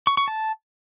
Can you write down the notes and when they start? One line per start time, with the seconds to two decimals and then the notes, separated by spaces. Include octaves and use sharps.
0.07 C#6
0.17 C#6
0.28 A5